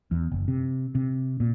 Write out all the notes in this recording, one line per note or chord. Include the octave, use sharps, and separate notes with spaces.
E2
F#1
C3
C3
A#2